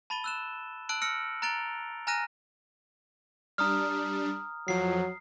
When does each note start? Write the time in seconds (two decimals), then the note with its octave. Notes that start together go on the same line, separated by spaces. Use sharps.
0.10 A5 B5 A6 D#7 G7
0.24 E6 F#6 E7
0.89 A5 E6 F#6 D7 F#7
1.02 E6 F6 A#6 C#7 D7
1.42 A#5 F#6 A6 D7 F7 G7
2.07 G#5 A#5 F6 F#6 A#6 D#7
3.58 G3 D4 A#5 D#6 F6
4.68 F2 F3 F#3 C7